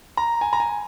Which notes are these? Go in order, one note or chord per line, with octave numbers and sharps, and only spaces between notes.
A#5
G#5
A#5
G#5